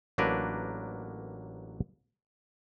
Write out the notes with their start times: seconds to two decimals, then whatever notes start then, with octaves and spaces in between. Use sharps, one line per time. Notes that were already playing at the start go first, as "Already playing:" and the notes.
0.18 A1 F#3 A#3 D4 A#4 B4